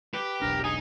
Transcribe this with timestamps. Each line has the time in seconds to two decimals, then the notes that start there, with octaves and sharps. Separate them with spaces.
0.14 G4 B4
0.41 E1 B1 D4 A#4
0.64 D#4 G#4 G#5